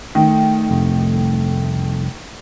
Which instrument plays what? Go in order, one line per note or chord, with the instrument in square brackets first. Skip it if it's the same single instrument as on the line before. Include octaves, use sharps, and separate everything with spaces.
[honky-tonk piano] D#3 [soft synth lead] A3
[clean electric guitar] C2 F2